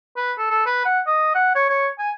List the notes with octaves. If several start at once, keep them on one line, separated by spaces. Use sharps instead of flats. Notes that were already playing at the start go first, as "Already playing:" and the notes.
B4
A4
A4
B4
F#5
D#5
F#5
C#5
C#5
G#5